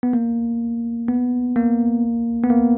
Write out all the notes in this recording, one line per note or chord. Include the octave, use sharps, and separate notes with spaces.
B3
A#3
B3
A#3
B3
A#3